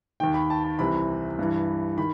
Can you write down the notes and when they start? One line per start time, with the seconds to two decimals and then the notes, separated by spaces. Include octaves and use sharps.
0.20 D#2 D#3 G5
0.34 B5
0.50 A5
0.64 A5
0.79 C2 C3 E3 B5
1.39 G2 E3
1.97 D#3 B5